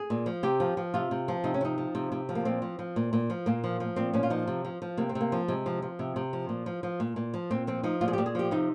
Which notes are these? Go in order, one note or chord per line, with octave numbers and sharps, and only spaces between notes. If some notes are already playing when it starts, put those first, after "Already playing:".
Already playing: G#4
A#2
F3
C3 G4
F3
F3
C3 F4
C3
F3
C3 D#4
C#4
F3 D#4
F3
C3
C3
F3
A#3
A#2 C4
F3
F3
A#2
A#2
F3
A#2 A#3
F3
F3
A#2 C4
A#2 C#4
F4
F3 D#4
C3
F3
F3
C3 A#3
C4
C3
A#3
F3
C3 G#3
F3
F3
C3
C3
F3
A#2
F3
F3
A#2
A#2
F3
A#2 C4
F3 C4
F3 D#4
A#2 F4
G#4
G4
A#2
G#4
F3 G4
C3 D#4